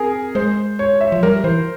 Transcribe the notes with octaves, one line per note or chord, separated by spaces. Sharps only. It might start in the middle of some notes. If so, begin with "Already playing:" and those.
Already playing: C4 G#4 A#4
G#3 C5
C#5
E5
F3
G3 A#4
E3 C5